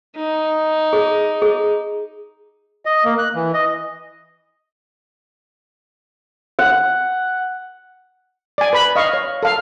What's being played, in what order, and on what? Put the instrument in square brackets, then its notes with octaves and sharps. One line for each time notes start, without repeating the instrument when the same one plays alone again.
[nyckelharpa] D#4
[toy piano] G#4
G#4
[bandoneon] D#5
A#3
F#6
E3
D#5
[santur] F#5
[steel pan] D5 G#5
B4 B5
D#5 F5 C#6
C#5
A4 F5